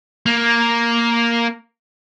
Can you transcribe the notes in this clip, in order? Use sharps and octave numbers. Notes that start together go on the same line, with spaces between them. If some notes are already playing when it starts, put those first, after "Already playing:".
A#3